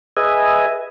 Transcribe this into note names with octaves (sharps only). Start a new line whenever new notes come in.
G#4 B4 D#5 E5 G#5